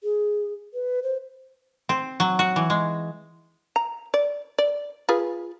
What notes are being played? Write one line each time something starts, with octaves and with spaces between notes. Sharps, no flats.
G#4
B4
C5
C4
F#3
F#4
E3
G#3
A#5
D5
D5
F4 G#4 B4